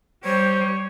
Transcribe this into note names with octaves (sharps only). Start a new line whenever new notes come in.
G3 C5 C#5